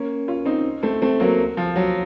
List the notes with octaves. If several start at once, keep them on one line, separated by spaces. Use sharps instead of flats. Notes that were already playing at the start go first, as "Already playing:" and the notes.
Already playing: A#3 C#4
C#4 F4
C4 D#4
A3 C4
A3 C4
F#3 A#3
F3
F#3